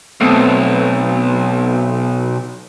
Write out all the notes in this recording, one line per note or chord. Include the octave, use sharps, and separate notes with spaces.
B1 A3 B3 C4